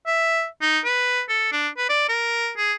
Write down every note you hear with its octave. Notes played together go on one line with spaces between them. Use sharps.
E5
D#4
B4
A4
D4
B4
D5
A#4
G#4